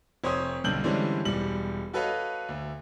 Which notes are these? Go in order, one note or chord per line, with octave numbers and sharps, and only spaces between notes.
F1 C5 C#5 C6 D#6
B1 G2 D3 G6 F#7
D3 E3 G3 G#3 C4 C#4
E1 G3 F#7
F#4 A4 B4 C#5 D#5 F5
D2